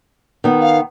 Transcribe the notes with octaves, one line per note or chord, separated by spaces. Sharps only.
D#3 B3
F5